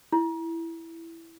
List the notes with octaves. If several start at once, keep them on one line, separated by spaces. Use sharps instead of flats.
E4